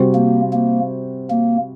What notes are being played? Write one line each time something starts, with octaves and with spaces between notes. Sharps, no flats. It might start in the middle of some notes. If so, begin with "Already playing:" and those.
Already playing: C3 G3 C4 F#4 C5
A#3
A#3
A#3